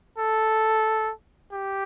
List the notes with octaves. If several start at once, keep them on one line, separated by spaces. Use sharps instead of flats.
A4
G4